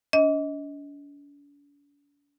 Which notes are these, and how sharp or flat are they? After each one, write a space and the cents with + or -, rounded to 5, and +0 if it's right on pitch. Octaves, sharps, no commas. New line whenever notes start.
D4 -45 D#5 +25